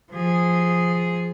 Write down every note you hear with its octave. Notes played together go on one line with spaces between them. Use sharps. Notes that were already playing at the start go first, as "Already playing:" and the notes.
F3 G#4